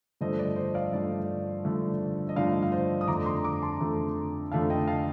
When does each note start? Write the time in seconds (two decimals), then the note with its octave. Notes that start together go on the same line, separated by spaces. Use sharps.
0.21 G2 D3 F3 A3 C5 D#5
0.39 D5
0.56 C5 D#5
0.74 D5 F5
0.93 G2 D3 F3 A3 D5
1.64 G2 D3 F3 A3
2.29 D#5
2.36 G2 D3 F3 A3 D5 F5
2.62 F5
2.72 C5 D#5
3.01 D#6
3.08 F2 D3 A3 D4 A#5 D6
3.26 C6 D#6
3.44 A#5 D6
3.62 A5 C6
3.81 F2 D3 A3 D4
4.52 F2 D3 A3 D4 F5 A5
4.70 D#5 G5
4.88 F5 A5